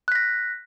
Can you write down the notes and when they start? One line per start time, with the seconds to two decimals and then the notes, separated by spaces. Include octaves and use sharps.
0.08 F#6
0.12 B6
0.15 A#6